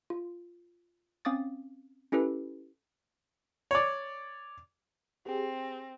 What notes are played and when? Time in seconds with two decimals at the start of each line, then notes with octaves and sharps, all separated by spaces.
0.10 F4
1.25 C4 C#4 F5 D6 D#6 A6
2.12 C#4 E4 G4 A4 B4
3.71 C#5 D5
5.26 C4 G4 G#4